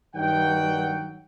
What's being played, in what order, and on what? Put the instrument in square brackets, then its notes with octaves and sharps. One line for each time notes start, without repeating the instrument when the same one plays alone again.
[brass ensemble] G2 D#3 F#3 F#5 G5